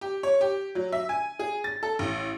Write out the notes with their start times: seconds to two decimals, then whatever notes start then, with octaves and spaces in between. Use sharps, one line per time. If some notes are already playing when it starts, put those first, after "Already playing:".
0.01 G4
0.23 C#5
0.41 G4
0.75 F#3
0.92 E5
1.09 G#5
1.39 G#4
1.64 A6
1.83 A4
1.99 A1